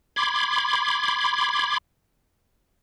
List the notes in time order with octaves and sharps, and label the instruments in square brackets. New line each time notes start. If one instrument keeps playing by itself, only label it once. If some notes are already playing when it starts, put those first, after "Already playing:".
[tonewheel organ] B5 C6 D6 G#6